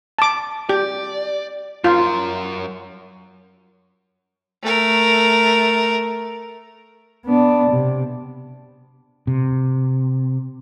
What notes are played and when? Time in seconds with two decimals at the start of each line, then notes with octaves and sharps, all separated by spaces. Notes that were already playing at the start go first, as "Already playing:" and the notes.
0.19 A5 D6
0.69 G4 D5
1.84 F#2 F4 A#4
4.63 A3 A#4
7.26 B3 D4
7.71 C3
9.27 C3